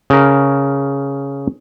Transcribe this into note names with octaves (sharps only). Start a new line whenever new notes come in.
C#3 A#4